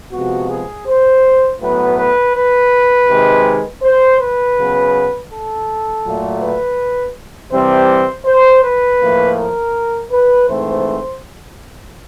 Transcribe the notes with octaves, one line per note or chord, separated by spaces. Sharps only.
C3 F3 G#3 B3 F#4
G#4
C5
A2 F#3 B3 B4
B4
B4
C3 D#3 G#3
C5
B4
C#3 F#3 B3
A4
A#2 F#3 A3
B4
C3 E3 G3 C4 C5
C5
B4
A2 F3 A#3
A#4
B4
G#2 E3 A3 C4 C5